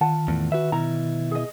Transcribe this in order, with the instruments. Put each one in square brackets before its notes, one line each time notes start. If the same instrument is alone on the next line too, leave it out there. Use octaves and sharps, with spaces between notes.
[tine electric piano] D#3 [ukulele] F4 F#5 A5
[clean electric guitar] E2 A2
F#4 B4 E5
[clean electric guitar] B2 E4 [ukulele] A#5
[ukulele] G#4 D#5